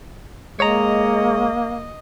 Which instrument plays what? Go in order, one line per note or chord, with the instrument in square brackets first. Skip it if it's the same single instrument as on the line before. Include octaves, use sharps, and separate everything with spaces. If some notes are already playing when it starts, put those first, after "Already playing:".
[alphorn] G#3 [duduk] A#3 [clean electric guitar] C#5 A#5 [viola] D#5